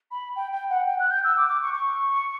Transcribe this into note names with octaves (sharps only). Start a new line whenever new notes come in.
B5
G5
G5
F#5
G5
F#6
G6
E6
D6
D6
C#6
C#6